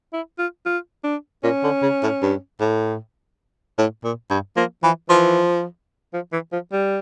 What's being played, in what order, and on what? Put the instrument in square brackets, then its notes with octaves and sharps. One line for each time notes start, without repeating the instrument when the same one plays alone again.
[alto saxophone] E4
F4
F4
D4
[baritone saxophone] A#2 [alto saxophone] C#4
[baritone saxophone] D3
C#3
A2
G2
A2
A2
A#2
G2
[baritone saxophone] F3 [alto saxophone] A#3
[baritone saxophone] E3 [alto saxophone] F3
[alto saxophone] E3 [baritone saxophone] F3
[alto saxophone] F3
E3
F3
G3